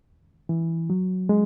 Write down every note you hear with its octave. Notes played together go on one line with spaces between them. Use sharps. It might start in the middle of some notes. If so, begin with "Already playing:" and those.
E3
F#3
G#3